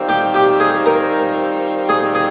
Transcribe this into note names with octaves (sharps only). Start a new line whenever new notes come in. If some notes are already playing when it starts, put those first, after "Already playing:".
Already playing: D#3 G3 C4 F4
G4
G4
G#4
A#4
G#4
G#4